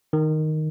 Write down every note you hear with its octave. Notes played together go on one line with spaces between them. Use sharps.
D#3